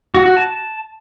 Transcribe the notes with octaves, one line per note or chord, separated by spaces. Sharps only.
F#4
F#4
A5